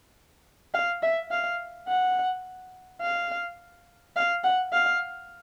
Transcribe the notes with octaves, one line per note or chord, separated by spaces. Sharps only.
F5
E5
F5
F#5
F5
F5
F#5
F5